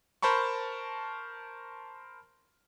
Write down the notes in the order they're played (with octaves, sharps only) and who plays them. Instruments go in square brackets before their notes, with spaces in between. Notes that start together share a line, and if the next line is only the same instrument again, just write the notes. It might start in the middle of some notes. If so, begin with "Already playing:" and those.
[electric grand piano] A#4 C5 A5 B5 C#6